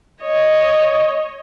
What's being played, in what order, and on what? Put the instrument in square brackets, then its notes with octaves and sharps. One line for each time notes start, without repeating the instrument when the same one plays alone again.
[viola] C#5 D#5